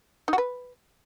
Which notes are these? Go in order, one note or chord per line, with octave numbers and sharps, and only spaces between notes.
D#4
F#4
B4